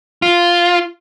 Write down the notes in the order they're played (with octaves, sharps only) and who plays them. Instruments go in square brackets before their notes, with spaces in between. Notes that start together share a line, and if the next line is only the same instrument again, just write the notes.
[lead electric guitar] F4